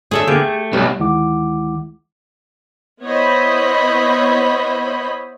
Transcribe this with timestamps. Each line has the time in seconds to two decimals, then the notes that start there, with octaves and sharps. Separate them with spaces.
0.11 A3 D4 G#4 A4 C#5 E5
0.27 D3 A#3 B3 G4 G#4
0.41 A3
0.73 B1 G3 B4
0.99 D2 D#3 G#3 E4 F#5 D6
3.03 B3 E4 C5 C#5 D#5 B5